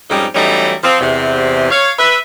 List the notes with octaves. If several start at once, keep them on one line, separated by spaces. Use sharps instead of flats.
F2 G#2 G3 C#4 D#4
E3 F#3 G3 A3 C#4 D#4
F3 C4
E2 C3
C#5 F5
B4 E5